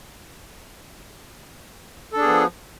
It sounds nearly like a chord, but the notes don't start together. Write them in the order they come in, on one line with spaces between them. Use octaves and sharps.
A4 D4 G#4 B3 F3